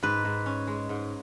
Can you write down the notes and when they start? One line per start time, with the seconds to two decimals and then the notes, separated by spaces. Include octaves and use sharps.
0.03 G#2 B4
0.25 G#2
0.46 C#4
0.67 G#3
0.89 G#2